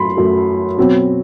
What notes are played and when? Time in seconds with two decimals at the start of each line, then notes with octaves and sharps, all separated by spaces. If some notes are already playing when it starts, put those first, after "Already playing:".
Already playing: F#2 F#3 A3 B5 C6
0.17 F#2 F#3 A3
0.77 B2 F#3 C4